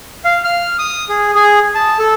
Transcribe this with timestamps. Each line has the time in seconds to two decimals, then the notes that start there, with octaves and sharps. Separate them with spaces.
0.25 F5
0.44 F6
0.78 D#6
1.09 G#4
1.35 G#4
1.75 A5
1.99 A4